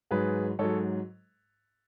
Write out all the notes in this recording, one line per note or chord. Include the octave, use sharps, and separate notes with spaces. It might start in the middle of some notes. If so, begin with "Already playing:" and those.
G#2 F#3 G#4 B4
G#2 F#3 A4 C#5